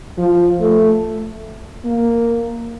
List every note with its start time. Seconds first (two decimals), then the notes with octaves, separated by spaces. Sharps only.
0.18 F3
0.60 A3
1.85 A#3